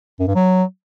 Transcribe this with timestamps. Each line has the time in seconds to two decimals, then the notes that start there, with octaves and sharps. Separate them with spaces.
0.20 F#2
0.27 G2
0.35 F#3